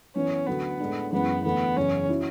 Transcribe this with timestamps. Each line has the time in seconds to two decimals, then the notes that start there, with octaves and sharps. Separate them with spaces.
0.16 F#2 E3 B3 C#4 E4
0.47 D2 D3 F#3 B3
0.80 A2 G#3 D4
1.12 F#1 F#2 E3 G#3 B3
1.44 E2 D3 A3 B3
1.77 F#1 E2 C#3 E3 C#4
2.09 F#3 C#4 E4